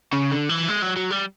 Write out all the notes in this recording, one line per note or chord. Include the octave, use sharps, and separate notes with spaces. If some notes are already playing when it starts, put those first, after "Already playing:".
C#3
D3
E3
G#3
F#3
F#3
G3